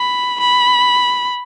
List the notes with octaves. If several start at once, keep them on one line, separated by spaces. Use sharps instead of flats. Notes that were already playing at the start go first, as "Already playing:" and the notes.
Already playing: B5
B5